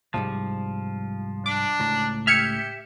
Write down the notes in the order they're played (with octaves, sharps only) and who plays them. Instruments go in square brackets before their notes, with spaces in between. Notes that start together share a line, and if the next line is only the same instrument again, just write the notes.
[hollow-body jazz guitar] C2 G#2 G3 [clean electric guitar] F3
[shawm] D4 [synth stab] D6
[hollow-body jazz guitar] C#2 A2 A#5
[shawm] G4 [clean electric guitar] E5 [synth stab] F6 G#6 C#7